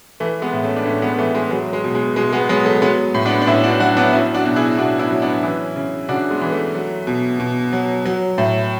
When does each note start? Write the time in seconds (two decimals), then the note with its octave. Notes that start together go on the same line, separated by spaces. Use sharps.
0.20 E3 A3
0.42 G#3 B3
0.53 A2
0.64 A3 C#4
0.76 D4
0.85 A2 A3 C#4
1.02 G#3 B3
1.18 E3 A3
1.35 G#3
1.51 F#3 G#3
1.73 G#3
1.84 B2
1.95 G#3
2.16 B2 G#3
2.32 G#3 B3
2.49 F#3 G#3 B3
2.66 A3
2.82 F#3 G#3 B3
3.14 A2
3.26 B3 D4
3.42 D4
3.47 A2 C#4 E4
3.63 D4 F#4
3.80 F#3 D4 F#4
3.97 B3 D4
4.12 F#3 C#4 E4
4.34 D4 F#4
4.45 B2
4.56 E4 G#4
4.78 B2 D4 F#4
4.99 C#4 E4
5.11 F#3
5.22 B3 D4
5.43 E3 C#4 E4
5.76 C#3
6.09 C#3 D4 F#4
6.31 G#3 B3
6.41 E3
6.52 A3
6.74 F#3
7.07 B2
7.40 B2
7.73 F#3
8.05 F#3
8.38 A2